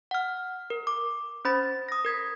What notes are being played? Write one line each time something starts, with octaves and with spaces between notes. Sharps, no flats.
F#5 F6
A#4
D6
C#4 C5 B5 A6
D#6 A#6
A#4 G#6 B6